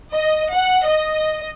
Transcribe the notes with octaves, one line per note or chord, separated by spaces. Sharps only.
D#5
F#5
D#5